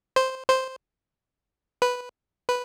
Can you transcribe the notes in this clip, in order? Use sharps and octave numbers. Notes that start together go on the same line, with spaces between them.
C5
C5
B4
B4